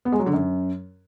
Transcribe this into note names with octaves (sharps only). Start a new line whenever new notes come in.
B3
G#3
F#3
D3
F#2